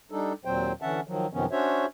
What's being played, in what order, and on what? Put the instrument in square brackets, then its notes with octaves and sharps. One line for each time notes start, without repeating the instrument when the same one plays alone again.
[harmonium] G3 D4 D#4 A4
D#2 A#2 F#3 C4 C5 G5
D3 E3 C#4 E5 F#5 A5
D#3 F3 F#3
F#2 C3 D#3 F3 B3 C#4
C#4 D4 F#4 C5 C#5 E5